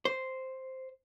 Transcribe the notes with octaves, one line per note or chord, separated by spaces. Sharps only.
C5